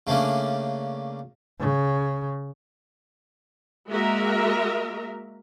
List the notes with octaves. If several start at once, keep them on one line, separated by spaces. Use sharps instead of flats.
C#3 A3 A#3 C#4 D4
C#3
G#3 A#3 F#4 A#4 E5 A#5